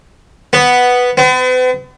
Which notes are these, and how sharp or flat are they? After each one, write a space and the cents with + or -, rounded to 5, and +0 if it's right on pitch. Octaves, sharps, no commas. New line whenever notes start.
B3 +0
B3 +45